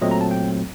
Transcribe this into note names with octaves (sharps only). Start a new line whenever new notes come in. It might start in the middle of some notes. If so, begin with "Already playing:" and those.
A#2 F#3 A3 C4 D#5
A#5
A5
G5